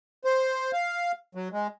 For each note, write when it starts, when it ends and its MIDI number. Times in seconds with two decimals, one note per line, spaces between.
0.24 0.71 72
0.73 1.12 77
1.35 1.48 54
1.52 1.67 56